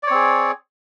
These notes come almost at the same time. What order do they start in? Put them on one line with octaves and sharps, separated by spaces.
D5 C#5 C4 G#4